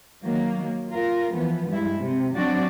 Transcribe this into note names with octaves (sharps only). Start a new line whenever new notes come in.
D#3 F#3 A#3
F4 A#4
E3 F3 B3
G2 G3 G#3 E4
C3
F#3 C4 D4 F#4 D5